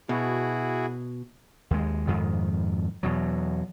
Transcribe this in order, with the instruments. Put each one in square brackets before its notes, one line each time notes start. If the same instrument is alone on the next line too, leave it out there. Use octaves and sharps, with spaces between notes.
[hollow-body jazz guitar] B2 [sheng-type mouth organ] E4 F#4 G#4
[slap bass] D#2 G#3
F2 G#2 D#3
E2 B2 F#3